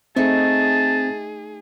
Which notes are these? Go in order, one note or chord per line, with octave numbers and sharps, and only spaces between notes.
A3 C4 D#4 G#4 A5